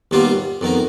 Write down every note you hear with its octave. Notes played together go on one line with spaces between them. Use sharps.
D#2 D#3 G3 B3 F4
F2 D#3 B3 D#4